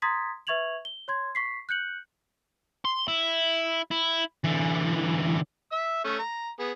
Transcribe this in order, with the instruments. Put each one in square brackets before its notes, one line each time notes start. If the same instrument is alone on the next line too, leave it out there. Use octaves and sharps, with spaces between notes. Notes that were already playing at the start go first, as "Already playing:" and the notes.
[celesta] A#5 C6 D#6 G#6 A6 B6
B4 E5 C#6 G#6 F7 F#7
G7
C#5 C6 G#6
C#6 B6 C7
F#6 G6 C#7 F#7
[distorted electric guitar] C6
E4
E4
D3 E3
[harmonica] E5 E6
A3 C#4
A#5
B3 G#4